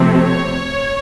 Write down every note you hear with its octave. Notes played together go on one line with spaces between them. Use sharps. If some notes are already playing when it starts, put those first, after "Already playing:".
Already playing: C3 F3 A3 C4
C#5